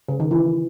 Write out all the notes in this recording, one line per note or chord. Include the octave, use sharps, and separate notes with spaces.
C#3
D#3
E3